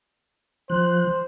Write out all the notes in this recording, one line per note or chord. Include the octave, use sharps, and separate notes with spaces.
F3 C5 F#6